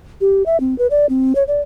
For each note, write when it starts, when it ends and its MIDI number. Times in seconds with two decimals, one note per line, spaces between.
0.21 0.43 67
0.46 0.60 76
0.60 0.77 60
0.78 0.87 71
0.91 1.06 74
1.09 1.33 60
1.35 1.43 73
1.48 1.61 74